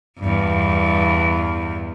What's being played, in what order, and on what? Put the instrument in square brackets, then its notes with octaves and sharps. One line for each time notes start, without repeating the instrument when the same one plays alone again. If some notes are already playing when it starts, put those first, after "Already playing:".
[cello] E2 G2